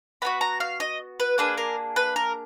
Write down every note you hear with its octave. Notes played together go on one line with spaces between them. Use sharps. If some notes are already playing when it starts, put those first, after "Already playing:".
B3 D#4 F#4 B5
A#5
F5
D#5
B4
A#3 D4 G#4 B4
A#4
B4
A#4